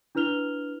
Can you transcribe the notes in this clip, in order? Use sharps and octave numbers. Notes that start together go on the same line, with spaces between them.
D4 E4 B4 F6 F7 G7